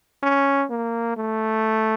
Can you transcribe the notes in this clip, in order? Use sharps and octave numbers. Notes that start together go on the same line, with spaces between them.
C#4
A#3
A3